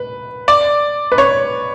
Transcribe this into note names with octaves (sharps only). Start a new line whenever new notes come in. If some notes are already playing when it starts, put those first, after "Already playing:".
Already playing: B4
D5
B4
C#5